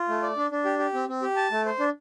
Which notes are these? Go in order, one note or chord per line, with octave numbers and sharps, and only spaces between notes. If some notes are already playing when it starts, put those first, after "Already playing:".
Already playing: F4
A3
D5
D4
D4
G4
G4
C4
C4
G4
A5
A3
C5
D4